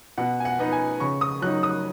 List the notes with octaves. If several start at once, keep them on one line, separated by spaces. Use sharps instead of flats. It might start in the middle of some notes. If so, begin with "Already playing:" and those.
B2 F#5
G#5
F#5
B3 D#4
G#5
C#3 C#6
D#6
F#3 D#4 F#6
D#6